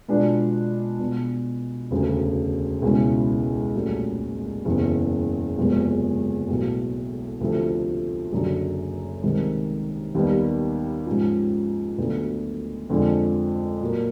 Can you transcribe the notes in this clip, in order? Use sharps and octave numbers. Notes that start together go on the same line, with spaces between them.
B2 G#3 B3 D4 F4
B2 G#3 B3
E1 D2 C#3
C#2 B2 G#3 C#4 E4
C2 A#2 F#3 A3 C#4
F#1 E2 C#3 E3
F#1 E2 C3 F3 G#3
B1 A2 F#3
D2 C3 F3 A3
F#1 F#2 D3 F#3
C2 C3 D#3 G#3 C4
D#2 D#3 G3 B3
G#2 F3 G#3 C#4 F4
D2 D3 F#3 B3
F2 D3 F3 G#3
A#2 F#3 A#3